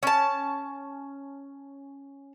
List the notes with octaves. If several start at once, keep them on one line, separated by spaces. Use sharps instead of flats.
C#4 A5